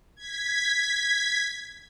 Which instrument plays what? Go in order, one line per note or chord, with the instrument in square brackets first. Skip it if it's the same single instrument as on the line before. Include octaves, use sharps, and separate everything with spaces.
[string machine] G#6 B6